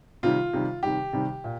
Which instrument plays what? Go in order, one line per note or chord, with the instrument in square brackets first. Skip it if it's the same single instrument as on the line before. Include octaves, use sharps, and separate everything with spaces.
[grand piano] C3 D#3 G3 F4
C3 D#3 G3
C3 D#3 G3 G4
C3 D#3 G3
A#2